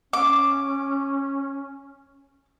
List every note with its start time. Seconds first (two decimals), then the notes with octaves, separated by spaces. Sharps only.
0.13 C#4 D6